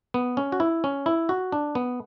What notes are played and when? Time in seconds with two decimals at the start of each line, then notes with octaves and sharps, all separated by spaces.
0.14 B3
0.37 C#4
0.52 F#4
0.60 E4
0.84 C#4
1.06 E4
1.29 F#4
1.52 D4
1.75 B3